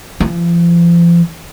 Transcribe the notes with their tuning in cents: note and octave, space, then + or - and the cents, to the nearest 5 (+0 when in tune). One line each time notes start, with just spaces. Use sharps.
F3 -40